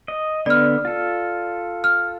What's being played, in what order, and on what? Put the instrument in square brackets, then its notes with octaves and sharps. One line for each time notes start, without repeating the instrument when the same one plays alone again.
[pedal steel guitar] D#5
[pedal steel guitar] D3 B3 [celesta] D5 F6
[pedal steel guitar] F4 A4
[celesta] F6